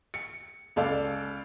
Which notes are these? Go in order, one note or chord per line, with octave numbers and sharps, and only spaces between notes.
C#7
C#2 A4 D5 F5